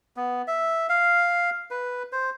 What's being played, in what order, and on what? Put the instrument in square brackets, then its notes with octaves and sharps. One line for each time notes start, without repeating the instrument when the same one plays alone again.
[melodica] B3
E5
F5
B4
C5